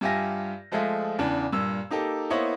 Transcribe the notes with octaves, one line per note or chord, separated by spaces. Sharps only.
G2 F4 G4 E5 G#5 A#6
F3 G#3 A3 F4 G#4 E5
E2 C#3 E3 D4
G2 A#2 E6
A#3 D#4 G4 A4
A#3 B3 E4 C5 C#5 D#5